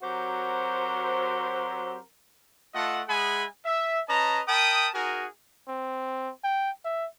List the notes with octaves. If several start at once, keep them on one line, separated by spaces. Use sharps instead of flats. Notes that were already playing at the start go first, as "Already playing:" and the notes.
F#3 C4 F#4 G4 A#4 C5
A3 F4 A4 D#5 F#5
G#3 G#4 E5 F#5 G#5 B5
E5
C#4 B4 D#5 A5 A#5
A#4 G5 A5 B5 D#6
D#4 F#4 G#4 A#4 G#5
C4
G5
E5